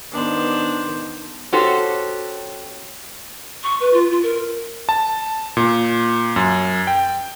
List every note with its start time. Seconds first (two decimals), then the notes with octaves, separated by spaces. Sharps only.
0.12 D#3 B3 D4 C5
1.53 C#4 F#4 G4 A4 C5
3.63 C#6
3.80 B4
3.93 F4
4.10 F4
4.23 A#4
4.89 A5
5.57 A#2
6.36 F#2
6.87 G5